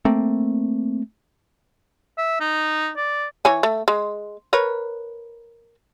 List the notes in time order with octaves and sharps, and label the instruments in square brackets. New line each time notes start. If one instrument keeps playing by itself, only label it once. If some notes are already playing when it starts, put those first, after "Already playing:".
[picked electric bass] A3 A#3 C4
[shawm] E5
D#4
D5
[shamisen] E3 C#5 G#5
A3
G#3
A#4 B4 C#5